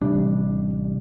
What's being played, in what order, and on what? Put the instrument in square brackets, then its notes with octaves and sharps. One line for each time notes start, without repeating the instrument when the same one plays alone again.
[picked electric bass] A1 C3 D4 [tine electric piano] G3